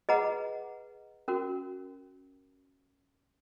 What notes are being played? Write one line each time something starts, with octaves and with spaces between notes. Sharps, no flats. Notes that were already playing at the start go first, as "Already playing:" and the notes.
G#4 B4 D#5 F#5 A#5
C#4 F#4 A#4